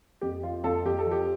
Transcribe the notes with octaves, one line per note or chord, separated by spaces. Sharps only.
F2 G4
F3 F4
F2 F4 A4
F2 G4
A4
F3 G4